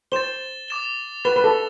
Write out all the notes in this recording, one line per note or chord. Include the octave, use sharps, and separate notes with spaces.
C5 A6 E7 G7
D6 A6 E7 G7
B4 A6 E7 G7
B4
A4